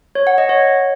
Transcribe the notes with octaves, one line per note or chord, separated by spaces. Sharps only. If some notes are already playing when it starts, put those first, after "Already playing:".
C#5
F#5
D#5
C#5